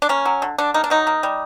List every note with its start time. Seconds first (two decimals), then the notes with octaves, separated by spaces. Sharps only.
0.02 D4
0.09 A#3 C#4
0.25 F#3
0.42 D3
0.58 D3 D4
0.74 A#3 D#4
0.84 D4
0.90 F#3 D#4
1.07 A#3
1.23 G3